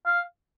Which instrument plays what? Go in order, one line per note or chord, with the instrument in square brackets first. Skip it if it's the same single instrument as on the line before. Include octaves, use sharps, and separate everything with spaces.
[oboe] F5